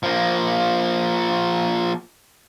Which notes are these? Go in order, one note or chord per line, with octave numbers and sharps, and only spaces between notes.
F3 A#3